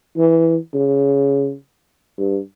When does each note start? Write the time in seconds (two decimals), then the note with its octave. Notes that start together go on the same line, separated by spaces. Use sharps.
0.17 E3
0.74 C#3
2.18 G2